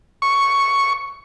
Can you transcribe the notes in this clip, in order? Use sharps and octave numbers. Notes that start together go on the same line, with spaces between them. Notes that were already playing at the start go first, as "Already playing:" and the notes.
C#6